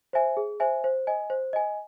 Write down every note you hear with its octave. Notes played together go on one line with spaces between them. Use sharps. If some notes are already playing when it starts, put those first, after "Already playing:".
C5 E5 G#5
G#4
C5 E5 G#5
C5
D#5 G#5
C5
D#5 G#5